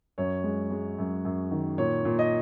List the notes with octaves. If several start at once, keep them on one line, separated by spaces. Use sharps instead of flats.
F#2 C#5
G#3
G#3
F#2
F#2
D#3
A#2 C#5
A#2
D#5